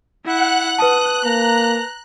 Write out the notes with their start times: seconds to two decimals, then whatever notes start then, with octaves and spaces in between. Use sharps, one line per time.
0.25 E4 F#5 F#6
0.78 B4 A5 D#6 F#6
1.25 A#3 A#5